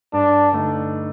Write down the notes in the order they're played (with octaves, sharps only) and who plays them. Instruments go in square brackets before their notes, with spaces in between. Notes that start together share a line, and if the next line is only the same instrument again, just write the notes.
[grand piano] G2 [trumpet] D4
[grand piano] D3 A3 D#4